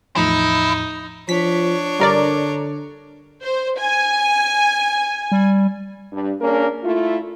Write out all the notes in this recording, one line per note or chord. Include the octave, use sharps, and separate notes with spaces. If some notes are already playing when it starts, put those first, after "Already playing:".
E2 A2 F3 D#4 E4
F3 D4 C#5 B6
G2 D3 A#4 D5
C5
G#5
G3
G2
A#3 C#4 D4 G#4 A#4
A3 E4 F4